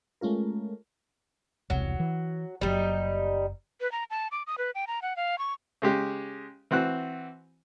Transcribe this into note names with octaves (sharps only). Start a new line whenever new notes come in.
G#3 A3 C#4 F4 A#4
E1 C2 F#3
E3
F#1 F#3 G3 D#4
B4
A#5
A5
D6
D#6
B4
G5
A#5
F#5
F5
C#6
C#3 G#3 G4
E3 C4 F#4 F#6